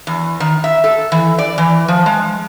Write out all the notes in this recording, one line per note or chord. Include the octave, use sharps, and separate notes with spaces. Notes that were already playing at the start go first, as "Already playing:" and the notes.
E2
D#3
E5
A4
E3
D5
E3
F3
G#3